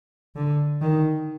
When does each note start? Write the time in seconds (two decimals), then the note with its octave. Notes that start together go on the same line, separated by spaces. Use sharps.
0.36 D3
0.81 D#3